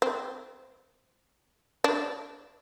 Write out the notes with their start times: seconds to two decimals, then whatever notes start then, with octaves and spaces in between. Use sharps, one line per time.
0.02 C4
1.84 D4